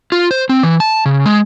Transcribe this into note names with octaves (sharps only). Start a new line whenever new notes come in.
F4
C5
C4
E3
A5
C#3
G#3